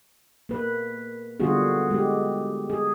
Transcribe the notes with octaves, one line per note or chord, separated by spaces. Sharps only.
A#3 B4
D3 G3 B3 F4 F#4 G#4
G#3 G4
G#4